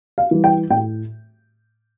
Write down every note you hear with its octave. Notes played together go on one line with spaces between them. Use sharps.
F5
E3 G3
G5
A2 G5